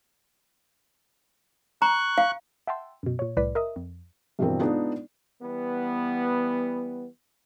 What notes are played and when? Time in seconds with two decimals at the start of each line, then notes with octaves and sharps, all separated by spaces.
1.82 A#5 C#6 F#6
2.18 F5
2.67 E5 F#5 G5 A5 C6 E6
3.03 F#2 B2
3.19 A#2 C#5
3.37 C2 A2 B4 D5 B6
3.55 A#4 D#5 E5 D#6
3.76 F2
4.39 G2 B2 E3 G3 C4 A#4
4.59 G#3 B3 D4 D#4 F4
5.41 E3 G3 B3